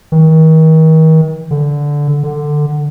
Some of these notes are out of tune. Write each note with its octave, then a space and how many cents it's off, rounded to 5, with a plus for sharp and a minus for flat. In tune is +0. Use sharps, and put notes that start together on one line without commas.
D#3 +40
D3 -10
D3 +15